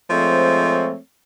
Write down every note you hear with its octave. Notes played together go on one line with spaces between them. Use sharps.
F3 G#3 A3 C4 C#5